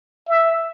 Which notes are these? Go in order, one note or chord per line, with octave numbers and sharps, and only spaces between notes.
E5